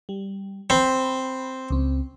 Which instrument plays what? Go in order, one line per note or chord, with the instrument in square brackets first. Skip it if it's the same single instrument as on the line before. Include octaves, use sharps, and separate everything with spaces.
[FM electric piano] G3
[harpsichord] C4 [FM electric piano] B5
[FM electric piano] C#2 C4